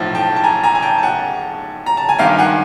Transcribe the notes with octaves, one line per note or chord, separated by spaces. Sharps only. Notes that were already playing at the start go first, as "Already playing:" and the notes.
Already playing: B1 A2 F3
G5 A5
A5
G#5 A#5
G#5 A#5
G#5
G5 A5
A5
F#5 G#5
A#5
A5
G#5
G#1 G2 D#3 F5 G5
F#5 G#5